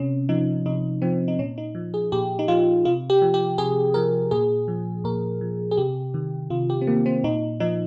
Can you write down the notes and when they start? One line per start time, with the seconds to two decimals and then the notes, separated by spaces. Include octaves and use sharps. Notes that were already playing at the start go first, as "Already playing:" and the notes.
Already playing: C3 C#4
0.29 F3 D#4
0.66 C3 D#4
1.02 F3 C4
1.28 D#4
1.39 A#2 C#4
1.58 D#4
1.75 F3
1.94 G#4
2.12 A#2 G4
2.39 D#4
2.48 F3 F4
2.85 C3 F4
3.10 G4
3.22 F3
3.34 G4
3.58 C3 G#4
3.94 F3 A#4
4.31 A#2 G#4
4.68 F3
5.04 A#2 A#4
5.41 F3
5.71 G#4
5.77 C3 G4
6.14 D#3
6.50 C3 F4
6.70 G4
6.81 C4
6.87 D#3 A#3
7.06 C4
7.24 A#2 D#4
7.60 F3 D#4